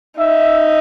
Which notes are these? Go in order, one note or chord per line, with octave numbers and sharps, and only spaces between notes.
D#4 E5